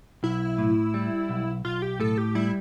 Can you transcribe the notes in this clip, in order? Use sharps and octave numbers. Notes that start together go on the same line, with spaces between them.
B1 E4
A2
G3
B1
B1 F4
G4
A2 A4
G4
G3 E4